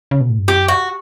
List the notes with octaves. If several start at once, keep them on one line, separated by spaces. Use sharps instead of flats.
C#3
B2
A2
G2
F#2 G4
F#4